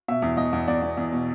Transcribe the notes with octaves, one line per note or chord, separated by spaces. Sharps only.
B2 E5
E2
E2 D#5
E2
E2 D5
E2
E2
B2